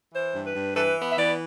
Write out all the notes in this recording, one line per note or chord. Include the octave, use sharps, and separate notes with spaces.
E3 C5
G2
B4
G2
A4
E3 B4
B3
E5
E3 D5